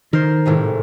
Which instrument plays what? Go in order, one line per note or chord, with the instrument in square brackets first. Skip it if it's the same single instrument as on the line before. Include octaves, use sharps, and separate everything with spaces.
[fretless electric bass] D#3 [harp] A#4 C5
[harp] G#1 A2 C3